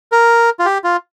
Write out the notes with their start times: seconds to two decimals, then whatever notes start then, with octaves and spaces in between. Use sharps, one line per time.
0.12 A#4
0.59 F4
0.65 G4
0.84 F4